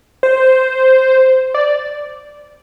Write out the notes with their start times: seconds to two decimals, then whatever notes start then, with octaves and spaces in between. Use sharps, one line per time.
0.23 C5
1.54 D5